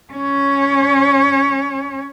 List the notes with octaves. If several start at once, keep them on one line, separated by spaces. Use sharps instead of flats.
C#4 C#5